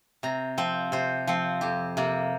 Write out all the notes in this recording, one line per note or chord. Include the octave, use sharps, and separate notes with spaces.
C3 A#5
F3 C4
C3 C5
F3 C4
F2 G4
C3 A#3